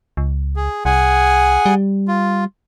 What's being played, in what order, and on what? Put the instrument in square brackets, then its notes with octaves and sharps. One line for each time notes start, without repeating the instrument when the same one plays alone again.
[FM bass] C#2
[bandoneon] G#4
[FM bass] C2 [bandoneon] G#4 F#5 G#5
[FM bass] G3
[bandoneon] F4